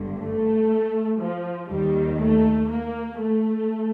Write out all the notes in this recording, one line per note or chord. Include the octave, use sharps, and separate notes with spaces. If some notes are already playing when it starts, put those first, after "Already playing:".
Already playing: G1 G2 D3
A3
F3
D#2 D#3 G3
A3
A#3
A3